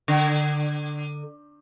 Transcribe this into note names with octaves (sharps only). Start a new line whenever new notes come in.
D3